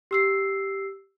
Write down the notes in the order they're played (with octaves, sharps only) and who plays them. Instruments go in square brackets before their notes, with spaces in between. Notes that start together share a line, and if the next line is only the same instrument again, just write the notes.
[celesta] G4 E6 C7